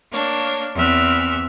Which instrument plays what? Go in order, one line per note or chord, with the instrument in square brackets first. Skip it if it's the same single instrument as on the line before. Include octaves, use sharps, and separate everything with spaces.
[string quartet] A#3 D4 C#5
E2 C4 E5 F6 F#6